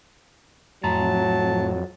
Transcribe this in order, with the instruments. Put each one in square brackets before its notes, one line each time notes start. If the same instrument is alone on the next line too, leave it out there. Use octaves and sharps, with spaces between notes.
[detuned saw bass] F2 [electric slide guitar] A2 A#5 [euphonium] F#3 [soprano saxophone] A5